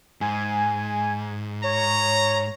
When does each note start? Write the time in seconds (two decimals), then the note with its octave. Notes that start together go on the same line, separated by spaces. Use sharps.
0.21 G#2 G#5
1.64 C#5 A#5